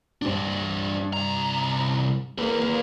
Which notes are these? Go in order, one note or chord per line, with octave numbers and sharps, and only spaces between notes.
G2 D4 C5
C2 A#5
A#3 G#4 B4